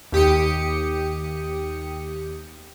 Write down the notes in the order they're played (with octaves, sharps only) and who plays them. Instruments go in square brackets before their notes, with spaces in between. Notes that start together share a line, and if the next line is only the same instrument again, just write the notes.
[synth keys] D#2 G4 D#6 C#7